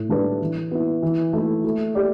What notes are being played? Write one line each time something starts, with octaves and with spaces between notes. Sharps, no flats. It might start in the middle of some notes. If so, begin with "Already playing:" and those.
Already playing: A2
G3 D4 B4 D5
E3
B3 E4
E3
A3 E4
A3
G4 D5